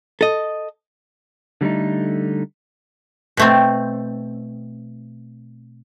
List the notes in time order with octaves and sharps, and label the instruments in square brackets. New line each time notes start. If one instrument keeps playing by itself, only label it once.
[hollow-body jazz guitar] A4 D#5
[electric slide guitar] D3 G3 A3 D#4
[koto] B2 A3 C4